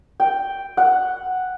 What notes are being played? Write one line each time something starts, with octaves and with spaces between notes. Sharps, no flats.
G5
F#5